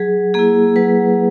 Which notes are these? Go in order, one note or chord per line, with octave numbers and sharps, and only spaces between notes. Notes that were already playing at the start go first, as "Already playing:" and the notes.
Already playing: F#3 G#4
A#3 E4 G#4
F#3 B4